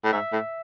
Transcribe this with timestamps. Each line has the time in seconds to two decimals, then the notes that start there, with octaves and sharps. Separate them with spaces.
0.04 A2
0.13 G#2 E5
0.32 A2